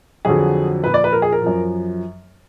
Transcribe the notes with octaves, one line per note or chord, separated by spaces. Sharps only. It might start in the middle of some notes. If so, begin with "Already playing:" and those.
F2 D3 F#3 G#4
A#2 F3 B4
D5
B4
A#4
G#4
A#4
F#2 F3